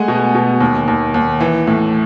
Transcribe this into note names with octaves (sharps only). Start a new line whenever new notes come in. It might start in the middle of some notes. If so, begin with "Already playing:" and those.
Already playing: G#3 A3 F#5 G#5
B2
B2
D#2
D#2
D#2
E3
A2